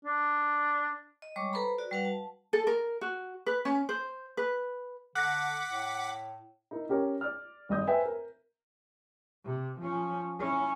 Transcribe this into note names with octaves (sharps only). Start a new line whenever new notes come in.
D4
D#5
G3 G#3 C#5 C#6 D6
A4 B4 C5 A#5 B5
F#4 D5
G3 F#4 B4 F5 F#5
A5
A4
A#4
F#4
B4
C#4
C5
B4
D3 F#5 D6 F#6 A#6 B6
A2
D#4 E4 A#4
C#4 G4 A#4 C#5
D5 F6
G#1 G2 D#5 D#6 G6
B4 C5 E5 G5 G#5
A#4
C3
F3 C#4
C#4 E4